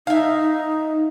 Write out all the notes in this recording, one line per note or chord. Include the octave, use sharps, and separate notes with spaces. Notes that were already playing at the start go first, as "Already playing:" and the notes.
D#4 E5 F5